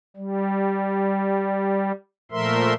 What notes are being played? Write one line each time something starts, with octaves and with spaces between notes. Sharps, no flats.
G3
A#2 F3 A3 A#4 E5 C6